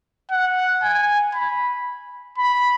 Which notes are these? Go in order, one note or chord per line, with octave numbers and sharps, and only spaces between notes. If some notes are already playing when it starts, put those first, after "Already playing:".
F#5
G#5
B5
B5